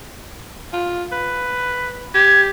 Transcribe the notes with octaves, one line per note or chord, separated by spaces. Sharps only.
F4
B4
G4 G#6